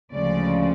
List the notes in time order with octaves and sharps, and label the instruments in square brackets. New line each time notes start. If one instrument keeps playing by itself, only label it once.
[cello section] D2 C#3 F3 G#3 D5